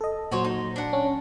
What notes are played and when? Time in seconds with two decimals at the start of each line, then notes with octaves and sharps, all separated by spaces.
0.01 A4 D#5
0.32 A#2 F#3 F#4 C5 C#5
0.45 D#4
0.76 D4 F#5
0.93 C#4